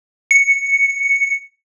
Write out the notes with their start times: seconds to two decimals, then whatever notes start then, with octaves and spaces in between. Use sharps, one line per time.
0.31 C#7